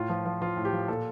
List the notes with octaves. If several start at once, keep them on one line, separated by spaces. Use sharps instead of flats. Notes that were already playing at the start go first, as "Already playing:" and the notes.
Already playing: A2 F4
F3
F3
F3 F4
A2
G4
F3
A#2 A4